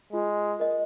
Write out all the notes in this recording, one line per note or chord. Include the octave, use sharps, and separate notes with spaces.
G#3 F4
A#4 D#5